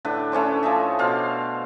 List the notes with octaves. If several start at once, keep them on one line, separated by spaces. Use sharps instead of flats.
A2 D3 D4 B4
A3 C#4 D4 C5
F3 A4 D#5 E5
B2 D4 C5 F5